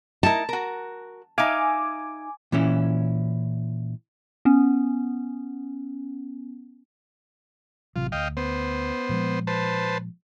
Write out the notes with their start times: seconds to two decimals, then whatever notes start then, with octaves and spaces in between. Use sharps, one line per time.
0.23 D#4 E4 A#4 A5
0.49 F#4 A#4
1.38 D#4 E5 F5 G#5 D6
2.52 A#2 E3 C#4 E4
4.45 B3 C#4
7.96 A1 C3 F#3 F4
8.12 D2 D#5 F5 G5
8.37 B3 C5
9.09 A#2 F3 G#3
9.47 B4 C5 A5